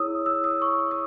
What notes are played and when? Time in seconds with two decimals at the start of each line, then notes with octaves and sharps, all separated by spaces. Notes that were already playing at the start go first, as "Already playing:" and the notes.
Already playing: E4 G#4 C#5 D#6 E6
0.26 E6
0.44 D#6
0.62 C#6
0.91 D#6